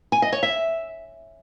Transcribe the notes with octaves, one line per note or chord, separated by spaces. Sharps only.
G#5
D#5
C#5
E5